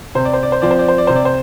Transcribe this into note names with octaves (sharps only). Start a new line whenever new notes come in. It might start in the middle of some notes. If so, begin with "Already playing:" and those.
C3 C5
D5
C5
D5
C5
F3 C4 D5
C5
D5
C5
D5
C3 C5
D5
C5